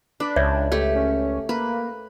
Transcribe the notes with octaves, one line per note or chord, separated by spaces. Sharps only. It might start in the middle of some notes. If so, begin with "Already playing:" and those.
D4 B4
C#2 C#5 D5 E5
A3 G4 D5
C#4
A#3 B4